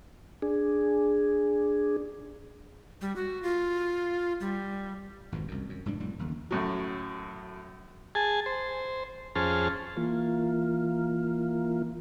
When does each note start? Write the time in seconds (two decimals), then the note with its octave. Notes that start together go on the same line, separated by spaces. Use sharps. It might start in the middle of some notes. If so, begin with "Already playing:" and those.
0.42 D4 G#4
3.01 G3
3.16 F#4
3.43 F4
4.40 G3
5.32 G#1 F2 B2
5.48 C2 F#2
5.69 F#2
5.86 F1 G#2 G3 D4
6.00 F1 A2 G3
6.19 F#1 D#2 D3
6.51 F#2 A2 F#3
8.15 G#4 G#5 A5
8.46 C5
9.35 F2 C#4 G#4 C5 A5 F6
9.97 E3 A#3 F4